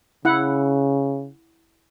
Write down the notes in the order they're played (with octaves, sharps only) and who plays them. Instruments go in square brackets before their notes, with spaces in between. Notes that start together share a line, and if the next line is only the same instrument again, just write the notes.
[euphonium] C#3 [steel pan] E4 F#5